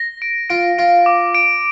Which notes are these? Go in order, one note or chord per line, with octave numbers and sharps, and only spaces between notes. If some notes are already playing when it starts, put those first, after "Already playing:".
Already playing: A#6
D7
F4 D7
F4 D7
D6
D7